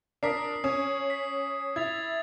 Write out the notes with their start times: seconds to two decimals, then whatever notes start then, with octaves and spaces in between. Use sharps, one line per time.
0.23 D4 A#4 D#6 B6 C7
0.64 C#4 D#6 G#6 E7
1.10 B6
1.76 E4 G#6 A6 F7